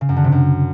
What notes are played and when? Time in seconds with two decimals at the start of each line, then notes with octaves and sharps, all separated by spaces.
0.01 C#3
0.09 F#2
0.17 D3
0.24 C3
0.32 F#2